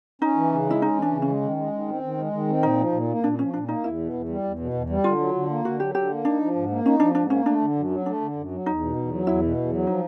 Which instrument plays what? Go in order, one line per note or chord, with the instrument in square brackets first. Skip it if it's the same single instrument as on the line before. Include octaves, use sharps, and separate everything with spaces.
[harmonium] C#4 [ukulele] D#4
[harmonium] E3
C#3
[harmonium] G#3 [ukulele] E4
[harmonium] C#4 [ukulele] D#4
[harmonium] E3
[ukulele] D4
[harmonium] C#3
[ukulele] C#4
[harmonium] G#3
D#3
G#3
D#3
C4
D#3
G#3
D#3
C4
[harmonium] A#2 [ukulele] D#4
[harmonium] F3
A#2
A#3
[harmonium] A#2 [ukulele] D4
[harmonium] F3 [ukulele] C#4
[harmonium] A#2 [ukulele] D4
[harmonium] A#3 [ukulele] D#4
[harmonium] E2 [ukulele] E4
[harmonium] B2
E2
G3
E2
B2
E2
G3
[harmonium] D3 [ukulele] F4
[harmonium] F#3
D3
A#3
[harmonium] D3 [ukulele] F#4
[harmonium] F#3 [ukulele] G4
[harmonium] D3 [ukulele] G4
[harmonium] A#3
[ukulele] D4 [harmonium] D#4
[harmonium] F3
G#2
A#3
[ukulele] C#4 [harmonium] D#4
[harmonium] F3 [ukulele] D4
[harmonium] G#2 [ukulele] D4
[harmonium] A#3 [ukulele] C#4
[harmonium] A3 [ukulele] D4
[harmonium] D3
F#2
F#3
[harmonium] A3 [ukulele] D4
[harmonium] D3
F#2
F#3
[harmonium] E2 [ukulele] D#4
[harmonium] B2
E2
F#3
[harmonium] E2 [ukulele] E4
[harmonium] B2
E2
F#3
[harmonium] F3 [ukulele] D#4